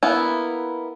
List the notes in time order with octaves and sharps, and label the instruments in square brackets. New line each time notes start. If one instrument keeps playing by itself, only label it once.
[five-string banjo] A#3 B3 E4